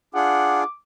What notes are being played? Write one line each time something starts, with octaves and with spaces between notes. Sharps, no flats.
D4 F4 G#4 F#5 D6